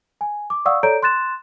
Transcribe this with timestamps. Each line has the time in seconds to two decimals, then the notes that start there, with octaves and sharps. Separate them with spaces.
0.21 G#5
0.50 D6
0.65 D5 F5 F#5 C#6 D#6 E6
0.83 A4 C#5 D5 A#5 G6 D7
1.03 C6 F#6 A6 E7